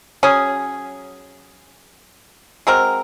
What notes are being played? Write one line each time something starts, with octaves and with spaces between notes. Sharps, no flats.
F#3 C#4 G#4
G#3 C4 F#4 A#4